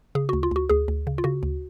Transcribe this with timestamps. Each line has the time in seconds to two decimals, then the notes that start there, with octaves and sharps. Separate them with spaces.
0.15 C#3 G#4
0.29 D2 F#4
0.43 F4
0.51 D2 F#4
0.69 D2 G#4
0.88 D2
1.07 C#3
1.18 F4
1.24 C#3 F#4
1.43 D2